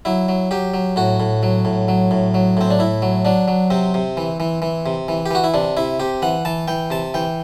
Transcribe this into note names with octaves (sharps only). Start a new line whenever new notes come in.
F#3 E4
F#3
F#3 G4
F#3
A2 F#4
A2
F#3
A2
F#3
A2
F#3
A2 C4
D4
A2 E4
F#3
F#3 D4
F#3
C3 C4
C3
E3
E3
E3
C3
E3
G4
E3 F#4
E4
C3 D4
C3 E4
C3 G4
E3 F#5
E3 A5
E3 G5
C3 A5
E3 G5